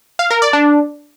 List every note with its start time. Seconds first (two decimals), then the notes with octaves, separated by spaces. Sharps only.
0.19 F5
0.30 A#4
0.42 D5
0.53 D4